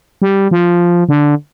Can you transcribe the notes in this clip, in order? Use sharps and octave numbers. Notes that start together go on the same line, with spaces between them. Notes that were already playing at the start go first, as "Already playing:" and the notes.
G3
F3
D3